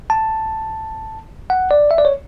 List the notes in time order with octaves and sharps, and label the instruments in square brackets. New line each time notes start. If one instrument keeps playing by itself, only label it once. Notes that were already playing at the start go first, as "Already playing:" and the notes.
[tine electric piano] A5
F#5
D5
E5
D5
C#5